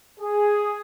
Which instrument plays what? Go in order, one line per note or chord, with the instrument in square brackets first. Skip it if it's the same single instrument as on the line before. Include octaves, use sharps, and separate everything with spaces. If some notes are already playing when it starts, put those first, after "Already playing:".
[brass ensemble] G#4